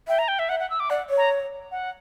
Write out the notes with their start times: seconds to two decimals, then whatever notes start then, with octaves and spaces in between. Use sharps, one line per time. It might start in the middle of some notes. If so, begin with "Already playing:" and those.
0.08 E5 G5
0.19 A#5
0.28 G5
0.39 E5
0.49 E5 F#5
0.60 F#5
0.70 E6
0.80 D6
0.90 D5 F#5
1.10 C#5
1.17 A#5
1.71 F#5